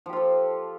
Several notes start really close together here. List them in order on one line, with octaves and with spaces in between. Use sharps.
F3 G4 F4 A4